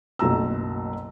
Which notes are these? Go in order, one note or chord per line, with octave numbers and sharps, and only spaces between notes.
F#1 B1 F#3 A3 A#5 E6